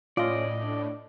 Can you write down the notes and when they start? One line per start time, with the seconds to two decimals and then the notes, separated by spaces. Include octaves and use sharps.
0.17 A2 C#4 F4 D5 D#5
0.63 D4